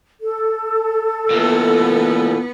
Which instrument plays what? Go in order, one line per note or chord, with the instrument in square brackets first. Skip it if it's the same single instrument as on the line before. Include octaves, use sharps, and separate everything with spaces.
[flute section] A4
[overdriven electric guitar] A#2 E3 [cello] B3